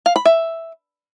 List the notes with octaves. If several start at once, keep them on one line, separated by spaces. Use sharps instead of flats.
F5
B5
E5